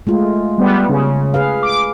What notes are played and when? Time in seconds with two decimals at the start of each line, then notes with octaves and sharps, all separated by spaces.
0.07 G#3 A3 F4
0.58 G3 B3
0.89 C#3
1.34 G#4 B4 F5
1.63 D6